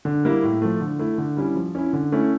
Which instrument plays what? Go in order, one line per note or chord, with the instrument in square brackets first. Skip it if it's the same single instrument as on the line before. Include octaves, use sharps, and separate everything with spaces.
[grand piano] D3
G3 A#3 E4
A2
F3 A3
D3
A3 E4
D3
G3 C#4 E4
F3
C#4 E4
D3
A3 C#4 E4